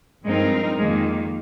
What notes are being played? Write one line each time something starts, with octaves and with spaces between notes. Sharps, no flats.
G2 F3 G#3 C4 D#4 A#4
F2 D#3 G#3 A#3